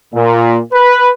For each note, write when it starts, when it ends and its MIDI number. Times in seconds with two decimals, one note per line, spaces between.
0.14 0.59 46
0.73 1.09 71